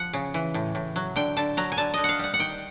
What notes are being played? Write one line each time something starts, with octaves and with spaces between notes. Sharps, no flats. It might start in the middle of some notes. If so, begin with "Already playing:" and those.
Already playing: F3 F#5
C#3
E3
A2
A2
F#3
D3 G5
D3 A5
F#3 A#5
G#5
D3 A5
D3 D#5
F5 F#5
G3 F#5
F#5
D#3 G5